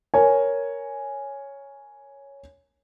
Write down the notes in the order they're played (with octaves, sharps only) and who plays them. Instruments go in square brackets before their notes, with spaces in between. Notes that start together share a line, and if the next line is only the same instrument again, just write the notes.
[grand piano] A#4 C#5 G#5